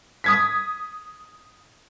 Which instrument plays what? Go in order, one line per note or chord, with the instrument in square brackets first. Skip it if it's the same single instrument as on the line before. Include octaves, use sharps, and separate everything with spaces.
[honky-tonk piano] D#6 G#6 B6